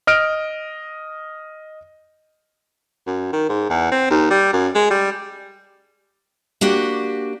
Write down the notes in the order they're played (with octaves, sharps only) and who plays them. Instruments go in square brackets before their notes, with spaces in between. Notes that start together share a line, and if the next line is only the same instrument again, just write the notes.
[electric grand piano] D#5 F6 D7
[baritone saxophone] F#2
D#3
G#2
E2
C4
D#2
G3
F#2
G#3
G3
[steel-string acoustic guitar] A#3 D4 F#4 G4